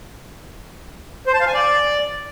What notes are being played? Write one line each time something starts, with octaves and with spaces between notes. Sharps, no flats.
C5
A5
F5
G#5
D5